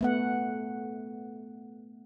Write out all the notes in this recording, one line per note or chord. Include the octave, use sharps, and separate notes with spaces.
A3 B3 F#5